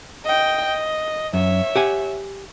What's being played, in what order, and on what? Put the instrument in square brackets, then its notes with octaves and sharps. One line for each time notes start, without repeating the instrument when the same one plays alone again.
[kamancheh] D#5 G5
D#5
[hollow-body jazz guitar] F#2 [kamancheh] C#5 E5
[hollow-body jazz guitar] G4 F#5 G#5